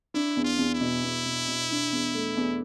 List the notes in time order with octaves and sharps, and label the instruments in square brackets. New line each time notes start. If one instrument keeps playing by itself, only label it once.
[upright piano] D4 [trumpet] E4
[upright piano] E2
[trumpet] F4
[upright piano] E2
[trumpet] E4
[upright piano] B2
E2
B2
B2
D4
E2
A3
E2